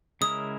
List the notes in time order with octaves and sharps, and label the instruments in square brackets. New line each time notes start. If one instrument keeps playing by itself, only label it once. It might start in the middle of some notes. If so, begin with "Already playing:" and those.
[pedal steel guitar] C#3 G#3 C#4 E4 A#4 [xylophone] D#6